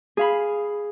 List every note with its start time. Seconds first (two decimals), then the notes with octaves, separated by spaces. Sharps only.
0.17 G#4 F5 B5